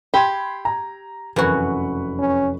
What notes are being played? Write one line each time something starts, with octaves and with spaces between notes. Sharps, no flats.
G4 B5 C6 G#6
A#5
F1 F#2 E3 F#4 B4 C#6
C#4